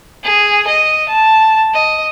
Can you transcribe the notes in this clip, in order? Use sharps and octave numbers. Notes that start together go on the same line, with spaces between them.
G#4
D#5
A5
D#5